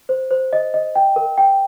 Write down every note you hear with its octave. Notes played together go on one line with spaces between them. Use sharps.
C5
C5
D#5
D#5
G5
A#4
G5